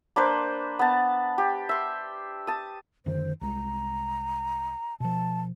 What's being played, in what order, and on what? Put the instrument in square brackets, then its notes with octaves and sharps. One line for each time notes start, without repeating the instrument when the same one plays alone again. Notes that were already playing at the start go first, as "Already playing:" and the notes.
[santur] A#3 D4 B4 C5
B3 A5
G4
E5 C6
A5 D#6
[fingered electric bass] F#2 D3 D#3 [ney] C5
[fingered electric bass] C2 G#3 [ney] A#5
[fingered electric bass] B2 F3 [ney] A5